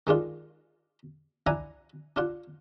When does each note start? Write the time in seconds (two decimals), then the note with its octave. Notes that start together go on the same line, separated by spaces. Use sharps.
0.07 D#3 G#3 D4 F4
1.47 D4 E4 F#5 G#5 A#5
2.16 D4 F4 F#5